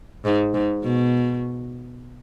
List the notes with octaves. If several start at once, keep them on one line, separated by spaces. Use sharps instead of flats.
G#2
G#2
B2